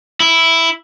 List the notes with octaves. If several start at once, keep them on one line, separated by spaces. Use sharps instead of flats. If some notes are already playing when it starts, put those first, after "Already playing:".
E4